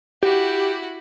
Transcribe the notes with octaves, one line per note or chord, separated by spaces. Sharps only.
E4 F#4 G4